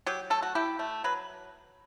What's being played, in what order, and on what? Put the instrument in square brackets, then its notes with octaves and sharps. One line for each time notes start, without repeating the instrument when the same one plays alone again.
[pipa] F#3 G4
A3 A4
F#4
E4 G4
A3
F#3 B4